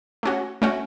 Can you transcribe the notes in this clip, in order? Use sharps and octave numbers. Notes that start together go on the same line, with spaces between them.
A3 C#4 F#4
A3 C#4 F#4